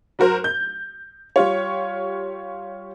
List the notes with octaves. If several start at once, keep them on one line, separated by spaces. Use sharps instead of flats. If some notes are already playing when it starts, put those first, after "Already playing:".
F#3 F#4 A#4 C5
G6
G3 F4 C#5